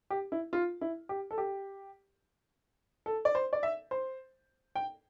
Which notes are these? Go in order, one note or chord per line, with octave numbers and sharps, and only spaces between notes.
G4
E4
F4
E4
G4
A4
G4
A4
D5
C5
D5
E5
C5
G5